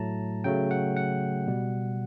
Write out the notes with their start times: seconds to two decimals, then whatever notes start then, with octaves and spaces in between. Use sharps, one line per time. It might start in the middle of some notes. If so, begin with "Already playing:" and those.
Already playing: A2 F#3 A3 A5 A#5
0.44 C#3 F#3 A3 G5
0.71 F#5
0.97 F#5
1.47 B2 G3